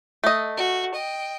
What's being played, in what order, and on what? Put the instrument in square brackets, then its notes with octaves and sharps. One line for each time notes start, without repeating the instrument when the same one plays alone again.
[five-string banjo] A3 D#5
[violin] F#4
D#5 G5